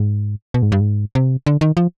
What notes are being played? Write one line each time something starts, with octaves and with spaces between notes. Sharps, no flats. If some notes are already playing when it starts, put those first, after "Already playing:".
Already playing: G#2
B2
G#2
G2
G#2
C3
D3
D#3
F3